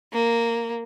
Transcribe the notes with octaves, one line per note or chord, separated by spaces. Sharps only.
A#3